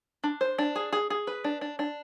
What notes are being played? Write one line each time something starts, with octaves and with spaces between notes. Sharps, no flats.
D4
C5
D4
G#4
G#4
G#4
B4
D4
D4
D4